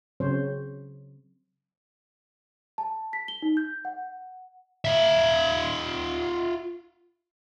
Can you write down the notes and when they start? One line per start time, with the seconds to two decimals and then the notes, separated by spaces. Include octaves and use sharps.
0.20 C#3 F#3 C4 C5 C#5
2.78 A5
3.13 B6
3.28 G7
3.42 D#4
3.57 G6
3.85 F#5
4.85 F4 E5